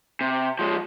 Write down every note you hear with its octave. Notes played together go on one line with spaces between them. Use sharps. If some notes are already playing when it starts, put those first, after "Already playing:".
C3
F3 G#3